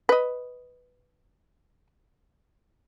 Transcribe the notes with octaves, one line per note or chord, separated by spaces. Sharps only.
B4 D#5